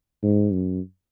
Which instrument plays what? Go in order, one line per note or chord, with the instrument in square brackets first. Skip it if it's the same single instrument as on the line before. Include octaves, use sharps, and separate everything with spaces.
[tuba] G#2
F#2